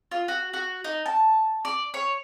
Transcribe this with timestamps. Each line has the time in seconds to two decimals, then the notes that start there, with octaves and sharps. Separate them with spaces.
0.11 F4
0.28 F#4
0.54 F#4
0.84 D#4
1.06 A5
1.65 D5
1.94 C#5